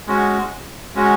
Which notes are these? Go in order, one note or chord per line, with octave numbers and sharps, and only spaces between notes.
G#3 C#4 F#4
G#3 C#4 F#4